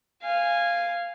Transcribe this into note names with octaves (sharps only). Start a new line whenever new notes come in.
F5 G#5